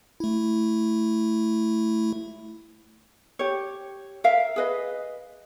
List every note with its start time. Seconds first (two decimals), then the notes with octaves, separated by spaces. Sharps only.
0.20 A3 E4
3.39 G4 C#5
4.24 A#4 E5 F5
4.56 G#4 B4 D#5